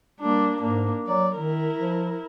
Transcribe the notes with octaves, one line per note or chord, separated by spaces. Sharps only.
G3 A#3 D4
G#2 A#3 D4
F#3 D5
D#3 E4 A#4
F3